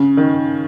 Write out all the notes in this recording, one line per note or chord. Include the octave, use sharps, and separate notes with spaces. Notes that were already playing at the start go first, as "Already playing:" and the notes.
Already playing: C#3
D#3